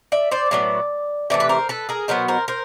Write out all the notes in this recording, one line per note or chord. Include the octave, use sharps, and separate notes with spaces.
D5 E5
C5 D5
A2 F#3 B3 D5
C3 E3 A3 D5
B4
A#4 C5
A4 B4
G#4 A#4
B2 F#3 B3 A#4 C5
A#4 C5
A#4 C5